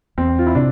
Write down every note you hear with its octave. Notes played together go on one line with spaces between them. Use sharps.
E2 C4
F4
E4
C3 D4